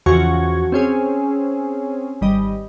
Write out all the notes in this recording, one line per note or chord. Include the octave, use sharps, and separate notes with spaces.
E2 C#3 F3 F#4 C#6 G#6
C4 C#4 G#4
G#1 G3 D#5